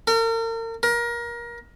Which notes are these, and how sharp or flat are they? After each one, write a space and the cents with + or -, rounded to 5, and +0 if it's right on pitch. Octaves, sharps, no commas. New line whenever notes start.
A#4 -40
A#4 +25